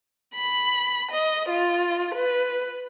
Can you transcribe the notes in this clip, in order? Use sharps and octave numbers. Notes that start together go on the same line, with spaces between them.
B5
D#5
F4
B4